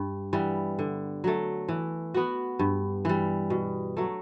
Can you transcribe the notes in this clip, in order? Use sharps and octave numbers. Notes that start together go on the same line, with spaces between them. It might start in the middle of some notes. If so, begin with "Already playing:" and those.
Already playing: G2
E3 G3 B3
D3
F#3 A3
E3
B3 F#4
G2
E3 G3
B2
F#3 A3